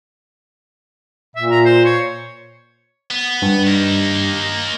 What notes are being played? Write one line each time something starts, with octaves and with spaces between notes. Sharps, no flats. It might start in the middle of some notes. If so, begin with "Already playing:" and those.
A#2 E5
A#5
C5
C#5
B3
G2
A#3 D#4